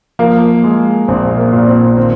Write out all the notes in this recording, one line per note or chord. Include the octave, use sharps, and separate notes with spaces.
F3 A#3
G#3
A#1 C4
A#3
A#2
C4
D#3 C4